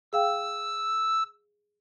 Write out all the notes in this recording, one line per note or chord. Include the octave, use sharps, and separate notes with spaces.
G#4 F5 G5 E6